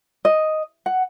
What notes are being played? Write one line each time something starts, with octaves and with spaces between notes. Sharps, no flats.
D#5
F#5